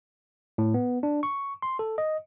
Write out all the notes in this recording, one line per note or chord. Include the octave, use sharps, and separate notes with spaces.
A2
B3
D4
C#6
C6
A4
D#5